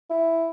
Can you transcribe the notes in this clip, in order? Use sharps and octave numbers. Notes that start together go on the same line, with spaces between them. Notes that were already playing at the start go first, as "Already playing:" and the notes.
E4